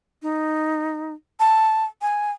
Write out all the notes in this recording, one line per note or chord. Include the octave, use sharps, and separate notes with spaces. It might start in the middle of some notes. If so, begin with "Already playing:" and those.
D#4
A5
G#5